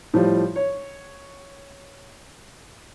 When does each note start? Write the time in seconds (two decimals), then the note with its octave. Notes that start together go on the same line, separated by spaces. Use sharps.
0.14 A2 F3 G3
0.56 C#5